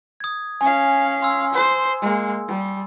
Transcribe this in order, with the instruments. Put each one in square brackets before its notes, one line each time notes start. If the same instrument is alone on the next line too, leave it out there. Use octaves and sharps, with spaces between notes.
[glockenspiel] D#6 G#6
[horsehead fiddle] C#4 F5 [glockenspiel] G#5
[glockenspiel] C6 E6
[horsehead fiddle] C5
G#3 A#3
G3